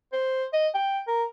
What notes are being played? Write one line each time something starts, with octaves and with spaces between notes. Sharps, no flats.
C5
D#5
G5
A#4